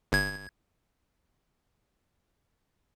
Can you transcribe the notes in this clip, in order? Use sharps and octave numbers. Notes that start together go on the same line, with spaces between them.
G1 G#6